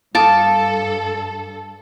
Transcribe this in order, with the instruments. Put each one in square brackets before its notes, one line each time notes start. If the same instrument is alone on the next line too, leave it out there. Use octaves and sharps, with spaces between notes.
[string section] G2 A4 [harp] F5 D#6 F6 [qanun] A5 D6